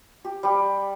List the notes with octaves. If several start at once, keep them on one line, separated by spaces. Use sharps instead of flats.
G4
G3 G4